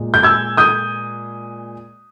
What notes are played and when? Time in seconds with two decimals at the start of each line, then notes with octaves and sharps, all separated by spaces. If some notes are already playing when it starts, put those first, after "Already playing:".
Already playing: A#2 G#3
0.14 G6
0.23 E6 G#6
0.57 D#6 G6